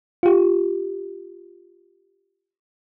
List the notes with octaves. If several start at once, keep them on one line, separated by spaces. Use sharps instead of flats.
F4 G4